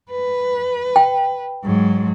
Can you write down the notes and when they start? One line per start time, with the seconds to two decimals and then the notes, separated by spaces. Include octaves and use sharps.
0.11 B4
0.96 G5
1.64 G#2 F#3